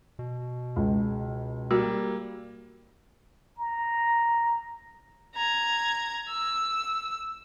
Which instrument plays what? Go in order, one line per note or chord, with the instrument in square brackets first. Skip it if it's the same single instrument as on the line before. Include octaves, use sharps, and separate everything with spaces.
[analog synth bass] B2
[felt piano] C#2
[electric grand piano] G3 A#3 [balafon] F#4
[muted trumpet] A#5
[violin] A#5 G#6
E6